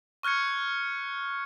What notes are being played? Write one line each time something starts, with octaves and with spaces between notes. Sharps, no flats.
C#6 F6 F#6 G#6 C#7